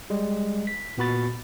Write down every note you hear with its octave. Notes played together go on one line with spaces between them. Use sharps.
G3 G#3
B6
A#2 B3 F#4 B5 A6